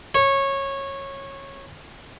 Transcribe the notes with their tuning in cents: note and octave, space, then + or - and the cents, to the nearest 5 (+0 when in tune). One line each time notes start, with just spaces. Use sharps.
C#5 -15